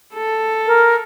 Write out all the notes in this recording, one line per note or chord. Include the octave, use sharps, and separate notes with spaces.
A4
A#4